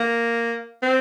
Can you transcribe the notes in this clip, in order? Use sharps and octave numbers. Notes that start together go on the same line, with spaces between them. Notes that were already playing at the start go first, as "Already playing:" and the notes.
Already playing: A#3
C4